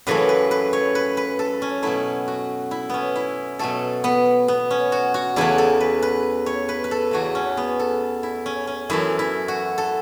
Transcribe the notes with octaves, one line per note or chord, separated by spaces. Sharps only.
F#2 C#3 E3 A3 B4
B4
B4
C#5
B4
B4
A4
C#4
B2 F#3 A3 E4
F#4
E4
B3 C#4
E4
B2 F#3 A3 A4
B3
B3
C#4
F#4
F#4
E2 C#3 A3 E4
A4
B4
B4
C#5
B4
B4
A4
E2 C#3 A3 F#4
C#4
B3
A4
E4
C#4
C#4
F#2 E3 A3 E4
E4
F#4
A4